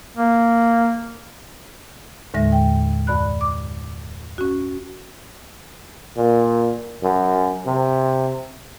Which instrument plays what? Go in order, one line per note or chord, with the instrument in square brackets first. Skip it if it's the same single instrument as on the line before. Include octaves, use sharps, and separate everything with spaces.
[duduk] A#3
[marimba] D#2 A2 D3 G#3 E5 A#6
G5
F#2 D5 B5 F#6
D6
C#4 F#4
[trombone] A#2
F#2
C3